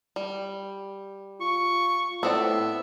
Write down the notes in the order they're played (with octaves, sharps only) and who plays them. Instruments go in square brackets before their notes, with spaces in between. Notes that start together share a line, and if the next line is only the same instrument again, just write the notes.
[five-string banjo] G3
[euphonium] F4 [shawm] C#6
[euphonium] A2 [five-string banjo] B3 C4 D5 [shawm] E5